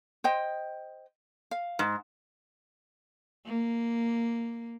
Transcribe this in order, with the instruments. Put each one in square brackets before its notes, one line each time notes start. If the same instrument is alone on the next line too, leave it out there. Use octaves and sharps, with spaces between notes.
[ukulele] C5 D#5 G5
F5
[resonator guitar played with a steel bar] G#2
[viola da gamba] A#3